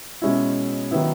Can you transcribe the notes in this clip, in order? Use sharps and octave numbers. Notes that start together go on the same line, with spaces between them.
B2 G#3 C#4 E4
D#3 F#3 B3 E4